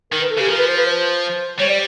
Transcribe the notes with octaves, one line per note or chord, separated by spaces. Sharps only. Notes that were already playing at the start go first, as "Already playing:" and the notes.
D#3 A#4
B4
A4
C#3 G4
F3 A#4
B4
C5
B4
C5
G3 C#5
D5